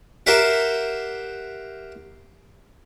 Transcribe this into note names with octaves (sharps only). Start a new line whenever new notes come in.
G4 A#4 C5 E5 F#5